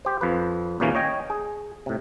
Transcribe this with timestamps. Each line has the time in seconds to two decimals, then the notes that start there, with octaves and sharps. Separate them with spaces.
0.05 G4 C5
0.21 F2 F3 B4
0.80 D#2 A#2 C#3 E3 A#3 C#4
0.95 C#5 D#5 G5 G#5
1.30 G#4
1.86 A2 C3